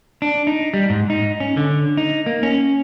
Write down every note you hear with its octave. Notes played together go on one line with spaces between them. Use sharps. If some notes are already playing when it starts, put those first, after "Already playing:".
D4
D#4
G3
G#2
D#4
C#4
D3
D#4
A#3
C#4